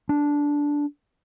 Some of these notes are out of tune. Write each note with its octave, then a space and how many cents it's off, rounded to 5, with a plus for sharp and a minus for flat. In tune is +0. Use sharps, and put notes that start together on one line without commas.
D4 -10